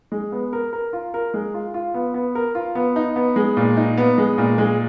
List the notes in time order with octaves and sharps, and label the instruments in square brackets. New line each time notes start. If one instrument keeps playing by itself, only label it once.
[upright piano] G#3
B3
A#4
A#4
F4
A#4
G#3
F4
F4
B3
B3
A#4
F4
B3
D#4
B3
G#3
A#2
D#4
B3
G#3
A#2
G#3